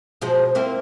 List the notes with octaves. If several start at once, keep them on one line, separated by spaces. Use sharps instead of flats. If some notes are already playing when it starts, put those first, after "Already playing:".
B2 F3 G#3
A#3 C4 E4